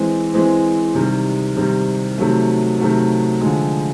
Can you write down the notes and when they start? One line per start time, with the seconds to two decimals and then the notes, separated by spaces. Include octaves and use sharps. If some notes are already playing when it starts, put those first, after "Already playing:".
Already playing: E3 G#3 C4
0.33 E3 G#3 C4
0.95 C3 D#3 G3
1.57 C3 D#3 G3
2.18 C3 D#3 F#3 A3
2.80 C3 D#3 F#3 A3
3.41 D3 F3 G#3